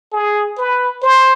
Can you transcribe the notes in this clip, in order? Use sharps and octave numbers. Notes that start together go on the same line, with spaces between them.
G#4
B4
C5